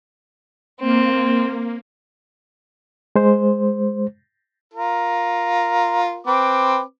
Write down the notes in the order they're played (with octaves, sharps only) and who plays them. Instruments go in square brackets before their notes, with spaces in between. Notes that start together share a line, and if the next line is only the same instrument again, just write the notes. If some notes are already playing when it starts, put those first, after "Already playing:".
[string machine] A#3 [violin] C4
[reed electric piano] G#3 C5
[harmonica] F4 A#4
C4 B4 D6